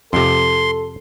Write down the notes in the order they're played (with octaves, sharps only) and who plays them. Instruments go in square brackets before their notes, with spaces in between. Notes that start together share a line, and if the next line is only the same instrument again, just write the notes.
[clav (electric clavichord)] F2 C3 [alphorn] A4 [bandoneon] C6